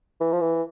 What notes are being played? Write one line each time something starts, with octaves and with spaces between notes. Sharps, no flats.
E3
F3
E3